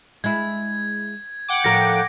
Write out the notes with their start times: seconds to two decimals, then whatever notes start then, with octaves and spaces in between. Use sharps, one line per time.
0.24 G#3 E4 G#6
1.48 F#5 G5 D6
1.64 A2 F3 A#4 A#6